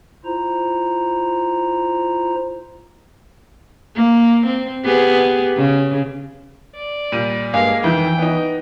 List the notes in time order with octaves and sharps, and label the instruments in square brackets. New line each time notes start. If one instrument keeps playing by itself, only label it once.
[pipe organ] E4 F4 C5 A#5
[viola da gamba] A#3
C4
B3 G4 G#4
C#3
[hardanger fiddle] D5
[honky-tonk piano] A#2 G3 D#7
[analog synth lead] G2 [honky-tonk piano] G#3 A#3 G#4 [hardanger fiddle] F5
[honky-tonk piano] F2 D#3 [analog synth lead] E3 [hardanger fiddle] G5
[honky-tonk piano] B3 D#4